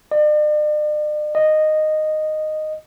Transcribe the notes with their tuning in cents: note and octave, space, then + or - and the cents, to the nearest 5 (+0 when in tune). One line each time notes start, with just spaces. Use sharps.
D5 +45
D#5 -10